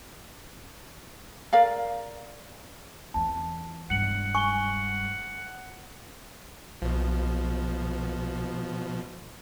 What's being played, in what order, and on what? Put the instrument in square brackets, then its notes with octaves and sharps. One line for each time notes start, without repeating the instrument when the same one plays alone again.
[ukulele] A#4 D5 F5
[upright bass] E2 C4 [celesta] A5
[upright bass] E1 G2 [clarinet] F#5 [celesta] C#7 F#7
[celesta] G#5 G7 [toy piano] C#6
[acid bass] B1 [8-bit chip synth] B2 F3